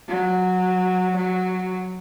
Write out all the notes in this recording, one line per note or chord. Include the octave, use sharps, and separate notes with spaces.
F#3
F#3